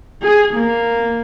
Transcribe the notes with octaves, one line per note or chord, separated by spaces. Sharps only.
G#4
A#3